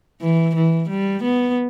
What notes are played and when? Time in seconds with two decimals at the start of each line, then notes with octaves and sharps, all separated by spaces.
0.22 E3
0.56 E3
0.90 G3
1.23 B3